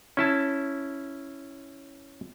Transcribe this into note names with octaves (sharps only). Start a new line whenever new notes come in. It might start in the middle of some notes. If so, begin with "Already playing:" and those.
C#4 E4 A5